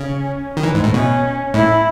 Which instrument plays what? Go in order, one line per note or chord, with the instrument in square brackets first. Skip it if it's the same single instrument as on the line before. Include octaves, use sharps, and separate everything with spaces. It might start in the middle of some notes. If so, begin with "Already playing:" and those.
Already playing: [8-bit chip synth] C#3 [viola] C#4
[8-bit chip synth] D#3
E3
G#2
A2
[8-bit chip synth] B2 [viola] C#4
[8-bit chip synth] A2 [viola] E4